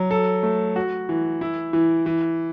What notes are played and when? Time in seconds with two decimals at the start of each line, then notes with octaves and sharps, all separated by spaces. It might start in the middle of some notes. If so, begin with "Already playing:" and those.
Already playing: F#3
0.11 A4
0.43 A3
0.76 F#4
1.09 E3
1.41 E4
1.73 E3
2.06 E3